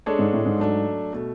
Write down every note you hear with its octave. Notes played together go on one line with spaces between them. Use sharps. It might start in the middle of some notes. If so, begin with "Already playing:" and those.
G#3 D4 A4 C#5
G#2
A2
G#2
F#3 A3 D4
B2 A3